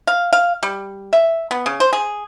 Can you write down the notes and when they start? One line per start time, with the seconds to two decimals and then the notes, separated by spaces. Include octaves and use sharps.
0.07 F5
0.33 F5
0.63 G3
1.13 E5
1.51 B3
1.66 C#3
1.80 C5
1.93 G#4